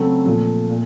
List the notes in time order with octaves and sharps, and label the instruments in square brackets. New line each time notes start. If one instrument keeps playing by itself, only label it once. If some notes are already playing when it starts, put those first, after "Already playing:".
Already playing: [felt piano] C#3 F#3 A3 C4
A#2 F3 A3
A#2